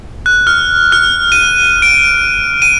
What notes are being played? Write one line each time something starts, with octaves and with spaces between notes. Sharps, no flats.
F#6
F6
F6
D#7
D7
D#7